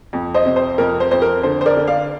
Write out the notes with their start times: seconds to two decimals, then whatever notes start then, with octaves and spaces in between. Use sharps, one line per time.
0.13 F2
0.34 C5 D#5
0.45 C3
0.56 C5
0.78 F2 A#4
1.00 C5
1.11 F2 C5
1.22 A#4
1.43 D3 C5
1.61 C5
1.66 A#4 D5
1.77 D3
1.87 D5 F5